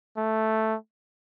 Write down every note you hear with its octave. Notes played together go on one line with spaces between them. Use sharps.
A3